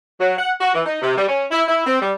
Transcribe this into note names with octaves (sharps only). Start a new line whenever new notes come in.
F#3
F#5
F#4
E3
D#4
C3
G3
C#4
E4
E4
C4
G3